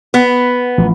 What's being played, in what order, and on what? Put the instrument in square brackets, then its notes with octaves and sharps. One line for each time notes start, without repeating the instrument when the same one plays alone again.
[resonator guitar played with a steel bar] B3
[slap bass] A1 F3